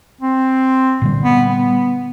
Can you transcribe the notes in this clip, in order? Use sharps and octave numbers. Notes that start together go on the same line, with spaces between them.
C4
A#2 D3 G3
B3
B3